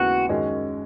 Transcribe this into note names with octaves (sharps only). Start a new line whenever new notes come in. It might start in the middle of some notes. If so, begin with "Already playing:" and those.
Already playing: D#2 C#3 G#3 B3 E4 F#4
F#2 D#3 G#3 C#4 F#4